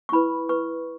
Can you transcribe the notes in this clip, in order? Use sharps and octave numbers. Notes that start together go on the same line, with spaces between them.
C#6
E4 B4 B5
B4 C#6